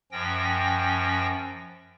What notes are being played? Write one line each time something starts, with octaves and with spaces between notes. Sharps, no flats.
F#2 F3 C#4 G5 A#6